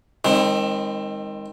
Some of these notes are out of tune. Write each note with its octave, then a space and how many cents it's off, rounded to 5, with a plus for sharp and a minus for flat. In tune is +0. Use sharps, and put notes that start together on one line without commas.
D#3 +10 G#3 -30 C4 +30